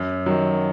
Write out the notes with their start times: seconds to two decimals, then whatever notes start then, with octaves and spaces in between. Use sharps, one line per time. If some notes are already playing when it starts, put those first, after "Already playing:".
Already playing: F#2
0.26 D#3 F#3